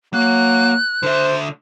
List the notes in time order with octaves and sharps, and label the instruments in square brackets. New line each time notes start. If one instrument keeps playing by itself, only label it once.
[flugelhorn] F#3 [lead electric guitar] A#3 [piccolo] F#6
[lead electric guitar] D3 E5 [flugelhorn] C5